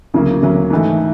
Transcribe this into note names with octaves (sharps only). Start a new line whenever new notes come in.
D2 C#3 F#3 A#3 C#4
D2 C#3 F#3 A#3 C#4
G#2 E3 A3